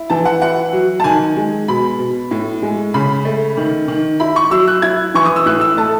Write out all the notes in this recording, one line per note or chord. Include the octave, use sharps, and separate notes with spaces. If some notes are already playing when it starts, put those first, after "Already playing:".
Already playing: E4
E3 A5
F#5
E4 F#5
F#3
A5
D#3 G#5
G#3
B2 B5
B2
A2
G#3
C#3 B5
A3
D#3
D#3
E4 B5
C#6
F#3 E6
F#6
E4 G#6
E3 C#6
D#6
E6
A2 F#6
E6
A3 A5